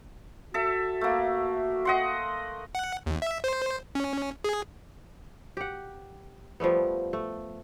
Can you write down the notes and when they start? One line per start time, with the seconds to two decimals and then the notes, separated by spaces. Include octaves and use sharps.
0.54 F#4 A4 E5
1.01 A3 A#3
1.85 D#5 F#5 C6
2.75 F#5
3.06 D#2
3.22 E5
3.44 C5
3.95 C#4
4.44 G#4
5.57 G4 F#5
6.60 F3 G3 A3 B3
7.13 A3